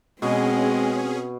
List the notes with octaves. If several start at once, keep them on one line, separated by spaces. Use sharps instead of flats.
B2 G#3 C4 C#4 G#4